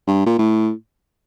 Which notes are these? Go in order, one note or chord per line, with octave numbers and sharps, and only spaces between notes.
G2
A#2
A2